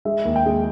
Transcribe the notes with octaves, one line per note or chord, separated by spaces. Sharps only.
G#3 E5
D#2
G5
G#3